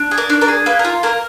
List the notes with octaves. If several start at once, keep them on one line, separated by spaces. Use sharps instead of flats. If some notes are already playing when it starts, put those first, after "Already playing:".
Already playing: D4
G#4
A#4 D5
D4
A#4 D5
G#4
A#3 B4
A#4
F4
A#3 A#4